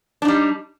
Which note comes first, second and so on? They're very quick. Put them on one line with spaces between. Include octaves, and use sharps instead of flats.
D4 D#4 G3